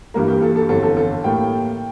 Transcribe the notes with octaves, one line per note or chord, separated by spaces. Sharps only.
G2 E3 G3 A#3 A#4
G4
A4
A4
G4
G1 F2 E3 A4
A4
A4
A2 G3 A#3 G5